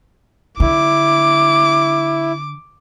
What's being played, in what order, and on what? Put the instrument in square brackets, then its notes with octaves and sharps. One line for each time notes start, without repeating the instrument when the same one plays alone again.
[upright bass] D3 [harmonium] E4 [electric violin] D6